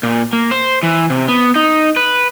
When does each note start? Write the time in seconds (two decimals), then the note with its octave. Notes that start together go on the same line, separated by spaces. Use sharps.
0.03 A#2
0.33 A#3
0.51 C5
0.83 E3
1.10 C3
1.28 B3
1.56 D#4
1.96 B4